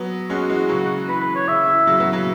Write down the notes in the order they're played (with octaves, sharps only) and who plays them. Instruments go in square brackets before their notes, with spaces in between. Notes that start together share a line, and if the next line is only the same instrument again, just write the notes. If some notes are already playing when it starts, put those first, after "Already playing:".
Already playing: [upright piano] F#3 B3
[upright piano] G#3 C#4 [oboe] F#4
[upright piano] E3 G#3
C#3 F#3
[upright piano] E3 [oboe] B4
[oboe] B4
C#5
[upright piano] C#3 [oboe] E5
[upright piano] E3
C#3 F#3
F#3 B3
C#3 F#3